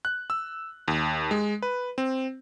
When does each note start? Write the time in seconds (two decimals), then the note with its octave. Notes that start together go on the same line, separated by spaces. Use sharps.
0.05 F#6
0.30 E6
0.88 D#2
1.31 G#3
1.62 B4
1.98 C4